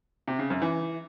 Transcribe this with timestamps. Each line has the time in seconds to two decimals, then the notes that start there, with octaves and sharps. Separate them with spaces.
0.28 C3
0.39 C#3
0.50 F#2
0.62 E3